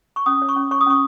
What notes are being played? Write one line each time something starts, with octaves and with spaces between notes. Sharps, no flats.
C#6
C#4 D#6
C#5
C#6
C#4
C#5 C#6
D#6
C#4 C#6